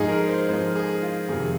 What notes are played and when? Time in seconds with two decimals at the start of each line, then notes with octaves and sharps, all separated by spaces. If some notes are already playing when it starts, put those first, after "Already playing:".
Already playing: G#2 F3 D#4 G#4
0.09 A#4
0.28 C5
0.48 G#2 F3 C5
0.75 G#4
1.02 F4
1.29 F2 C3 D#3 G#4